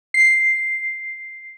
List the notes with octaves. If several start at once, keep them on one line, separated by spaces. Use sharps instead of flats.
C7